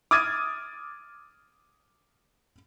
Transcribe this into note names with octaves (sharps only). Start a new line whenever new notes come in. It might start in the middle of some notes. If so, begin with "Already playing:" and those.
D6 D#6 F6 G#6 A6 D#7